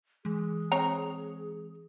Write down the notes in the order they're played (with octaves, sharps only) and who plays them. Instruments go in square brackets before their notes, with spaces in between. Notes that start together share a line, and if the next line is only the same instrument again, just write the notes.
[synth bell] E3 G#3 [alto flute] G#4
[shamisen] C4 C#5 A#5